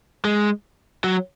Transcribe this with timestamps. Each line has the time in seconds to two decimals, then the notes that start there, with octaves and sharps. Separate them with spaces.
0.25 G#3
1.04 F#3